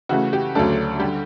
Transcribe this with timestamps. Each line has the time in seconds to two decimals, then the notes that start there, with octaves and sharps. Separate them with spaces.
0.09 C#3 E3 A3 F#4
0.33 G4
0.55 D2 C#3 F#3 A3 D4 A4
0.99 D3 G3 G4